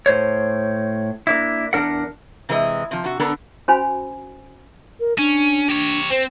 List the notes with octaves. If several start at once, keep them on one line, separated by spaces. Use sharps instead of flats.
A2 C5 C#5
A#3 D4 E4
E2 D4 A#4 F#5
C3 E3 G#3 A#4 D#5
C3 F3
C3 F#4
D3 B3 D4 A4 A#4
C#4 F#4 C5 G#5 B5
A#4
C#4 D4
G4 C#5
C4 C5